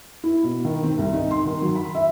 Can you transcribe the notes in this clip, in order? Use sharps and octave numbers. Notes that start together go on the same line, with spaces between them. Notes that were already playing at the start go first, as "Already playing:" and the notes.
E4
B2
D#3
C4
C2
D#4
C6
D#3
F#3
B5
E5